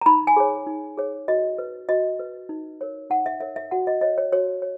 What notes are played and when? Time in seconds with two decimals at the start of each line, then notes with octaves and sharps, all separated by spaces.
0.01 A#5
0.06 D#4 B5
0.27 G#5
0.37 G#4 C#5
0.67 D#4
0.98 G#4 C#5
1.28 F#4 D#5
1.58 B4
1.89 F#4 D#5
2.19 B4
2.49 D#4
2.81 A#4 C#5
3.10 D#4 F#5
3.26 E5
3.41 A#4 C#5 E5
3.56 E5
3.71 F#4 F#5
3.87 D#5
4.01 C#5 D#5
4.18 C#5
4.32 F#4 C#5
4.62 C#5